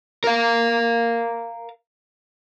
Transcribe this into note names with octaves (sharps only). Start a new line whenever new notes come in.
A#4 F5